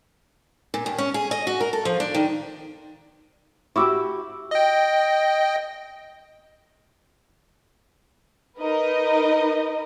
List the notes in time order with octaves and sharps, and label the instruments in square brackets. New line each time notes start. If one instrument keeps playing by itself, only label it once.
[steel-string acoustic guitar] A#2
D#2
C#4
G#4
D#5
F#4
A#4
A4
F3
D4
D#3
[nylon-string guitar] E4 F#4 G4 [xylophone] C#6 D6 E6
[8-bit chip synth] D#5 G5
[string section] D#4 A#4 B4 D#5